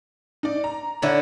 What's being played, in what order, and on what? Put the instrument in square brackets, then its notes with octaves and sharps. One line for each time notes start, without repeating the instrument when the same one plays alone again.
[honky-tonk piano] D#4 D5
A#5
[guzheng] D3 E4 C#5